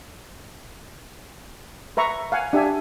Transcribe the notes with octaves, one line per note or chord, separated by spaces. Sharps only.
B4 E5 A#5 C#6
F5 F#5 G#5
D4 G4 E5 G#5